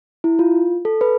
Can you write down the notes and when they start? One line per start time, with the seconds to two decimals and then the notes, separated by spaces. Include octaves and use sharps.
0.24 E4
0.39 F4
0.85 A4
1.01 B4